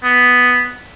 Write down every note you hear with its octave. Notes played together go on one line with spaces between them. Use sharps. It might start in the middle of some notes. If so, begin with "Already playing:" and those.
B3